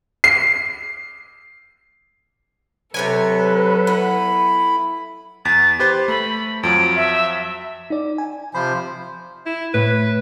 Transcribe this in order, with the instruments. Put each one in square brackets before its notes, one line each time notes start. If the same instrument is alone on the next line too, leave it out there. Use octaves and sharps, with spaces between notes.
[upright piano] C7
[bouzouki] C3 C#5 G#5 [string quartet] F#3 A4 [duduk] B4
[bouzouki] B3 [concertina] E4 B5
[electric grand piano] E2 B6 [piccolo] A6
[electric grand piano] G4 B4 C5
[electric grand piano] A3 [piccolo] B5
[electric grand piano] F2 F3 F#3 [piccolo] D7
[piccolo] E5
[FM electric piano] D#4 D5
G#5
[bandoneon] C3 F3 C5 [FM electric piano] B5
[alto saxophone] E4
[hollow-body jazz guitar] A2 [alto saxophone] B4